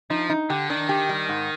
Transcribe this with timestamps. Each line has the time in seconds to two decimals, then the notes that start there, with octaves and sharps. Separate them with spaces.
0.10 F3 D#4
0.30 D#4
0.50 D3 G4
0.70 D#3 D4
0.89 G4
1.09 G3
1.29 G#2